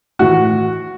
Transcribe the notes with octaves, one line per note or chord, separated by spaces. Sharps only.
A2 E3 F#4